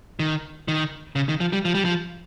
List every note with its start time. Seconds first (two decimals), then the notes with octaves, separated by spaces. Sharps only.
0.19 D#3
0.68 D#3
1.15 C#3
1.29 D#3
1.40 F3
1.53 G3
1.65 F3
1.74 G3
1.85 F3